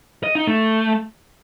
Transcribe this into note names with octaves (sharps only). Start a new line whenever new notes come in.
D#5
D#4
A3